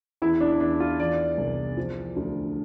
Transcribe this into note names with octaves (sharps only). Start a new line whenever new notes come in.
E2 E4
D4
E2 D4
F4
E3 D5
C2
F3
D2